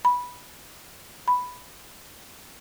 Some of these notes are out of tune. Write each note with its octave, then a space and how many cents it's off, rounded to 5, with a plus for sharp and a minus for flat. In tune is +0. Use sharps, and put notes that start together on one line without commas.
B5 -10
B5 +5